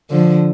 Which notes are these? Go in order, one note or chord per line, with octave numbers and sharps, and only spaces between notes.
D3 F3